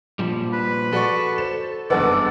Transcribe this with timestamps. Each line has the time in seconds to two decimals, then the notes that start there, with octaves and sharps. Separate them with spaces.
0.19 A#2 F3 G3
0.53 B4
0.93 F#4 A4 D5 C#6
1.38 C5 E7
1.90 F#1 E2 G2 B4 D5 F#5 E6